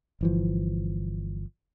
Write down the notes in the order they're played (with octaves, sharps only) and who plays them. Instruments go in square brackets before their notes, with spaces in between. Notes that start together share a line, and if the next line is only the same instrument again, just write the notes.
[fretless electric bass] G1 E3 F3